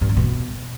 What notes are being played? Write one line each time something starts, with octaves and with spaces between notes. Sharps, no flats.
G2
E3
B2